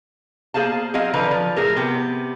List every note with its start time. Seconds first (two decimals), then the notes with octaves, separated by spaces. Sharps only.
0.54 A#3 G#4 C5 F5 A5
0.94 F#3 C4 G#4 D#5 F5
1.13 D3 F3 B4 A#5
1.31 F3
1.56 A2 G#4 A#4
1.76 C3 B3 G5